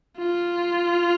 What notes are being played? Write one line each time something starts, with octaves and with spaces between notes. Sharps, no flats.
F4